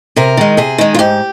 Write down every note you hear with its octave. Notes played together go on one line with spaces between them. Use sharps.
C3 A#4
D#3 G#3
C3 G#4
D#3 G#3
F4
G#2 G4